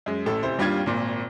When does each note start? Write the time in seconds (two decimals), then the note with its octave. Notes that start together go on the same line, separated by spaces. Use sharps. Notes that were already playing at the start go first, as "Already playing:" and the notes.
0.06 F#2 G#3
0.26 A1 A2 A4
0.43 F1 E4 C5
0.58 G#1 D#2 G3 D4 F4 G#6
0.86 G#1 A#2